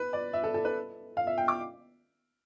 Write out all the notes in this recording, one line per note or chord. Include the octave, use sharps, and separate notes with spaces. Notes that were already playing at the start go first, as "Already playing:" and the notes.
Already playing: B4
D5
E5
A4
A4
B4
F5
E5
G5
D6